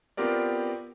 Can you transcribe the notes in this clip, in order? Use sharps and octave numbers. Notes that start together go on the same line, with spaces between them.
B3 C4 F4 G4 A#4 D5